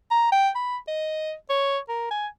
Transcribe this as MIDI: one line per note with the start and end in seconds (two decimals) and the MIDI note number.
0.11 0.32 82
0.32 0.49 79
0.56 0.77 83
0.88 1.34 75
1.50 1.79 73
1.89 2.08 70
2.11 2.27 80